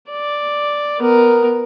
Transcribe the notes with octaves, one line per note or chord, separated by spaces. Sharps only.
D5
B3 A#4